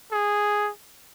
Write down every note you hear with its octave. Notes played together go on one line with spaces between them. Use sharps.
G#4